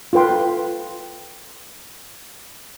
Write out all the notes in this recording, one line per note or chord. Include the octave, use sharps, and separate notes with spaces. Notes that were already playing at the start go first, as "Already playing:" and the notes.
F4 A4 B4 G5 C6